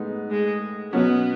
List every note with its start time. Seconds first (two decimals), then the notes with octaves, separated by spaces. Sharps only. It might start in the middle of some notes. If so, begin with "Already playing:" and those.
Already playing: A2 G#3 B3 D#4
0.31 G#3
0.93 B2 F#3 B3 C#4